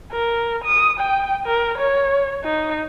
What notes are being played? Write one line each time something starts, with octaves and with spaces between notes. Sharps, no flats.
A#4
D#6
G5
A#4
C#5
D#4